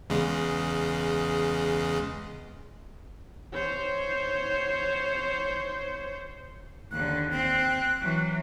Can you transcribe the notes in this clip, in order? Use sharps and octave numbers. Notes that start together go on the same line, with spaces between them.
E2 C#3 G#3
C5 C#5
D#2 D3 F#6
C4 F#6
E3 F#3